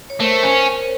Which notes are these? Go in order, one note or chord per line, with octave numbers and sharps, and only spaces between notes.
C#5
A3 A#4 C5
C#4